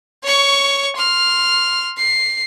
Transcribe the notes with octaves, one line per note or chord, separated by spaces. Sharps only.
C#5 C#6
C6 F6
C7